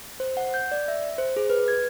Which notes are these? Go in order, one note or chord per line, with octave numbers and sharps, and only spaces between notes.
C5
F#5
G6
D5
E5
C5
G#4
B4
G#6